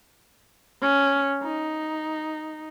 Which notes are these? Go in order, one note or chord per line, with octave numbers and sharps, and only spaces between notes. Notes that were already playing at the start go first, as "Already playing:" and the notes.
C#4
D#4